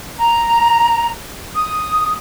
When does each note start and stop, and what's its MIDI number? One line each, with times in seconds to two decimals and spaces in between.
0.20 1.10 82
1.55 2.15 87